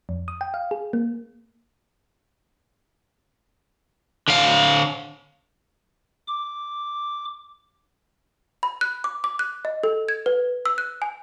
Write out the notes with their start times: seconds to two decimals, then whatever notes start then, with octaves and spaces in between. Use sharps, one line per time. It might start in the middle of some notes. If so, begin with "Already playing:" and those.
0.09 F2
0.28 D#6
0.41 G5
0.54 F5
0.71 G#4
0.93 A#3
4.28 D3 F5
6.28 D6
8.63 B5
8.81 F#6
9.04 D6
9.24 D6
9.39 F#6
9.65 D#5
9.84 A4
10.09 G#6
10.26 B4
10.66 E6
10.78 F#6
11.02 G#5